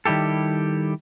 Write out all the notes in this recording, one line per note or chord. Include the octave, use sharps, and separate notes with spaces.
D#3 G3 E4 G4 A4